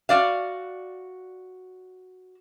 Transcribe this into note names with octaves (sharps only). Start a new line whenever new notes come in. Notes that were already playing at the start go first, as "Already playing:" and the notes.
F#4 D5 F5